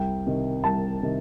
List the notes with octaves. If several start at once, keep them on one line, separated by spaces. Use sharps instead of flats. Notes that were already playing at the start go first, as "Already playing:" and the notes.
Already playing: C2 G5
C3 D#3
C2 A5
C3 D#3